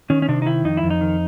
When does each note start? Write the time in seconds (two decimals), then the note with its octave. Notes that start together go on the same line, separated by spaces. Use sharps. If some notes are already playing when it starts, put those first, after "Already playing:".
0.10 D#3 C#4
0.22 C#4
0.28 C3 D4
0.42 D#4
0.46 D#3 E4
0.65 F2 D#4
0.77 E4
0.83 F2
0.90 D#4
1.01 D#3